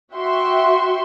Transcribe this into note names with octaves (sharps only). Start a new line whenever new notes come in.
F#4 E5 G5 C6 C#6